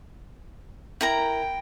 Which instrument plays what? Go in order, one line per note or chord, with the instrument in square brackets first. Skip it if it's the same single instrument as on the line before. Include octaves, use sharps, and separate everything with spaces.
[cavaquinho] E4 A#4 A#5 [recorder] G5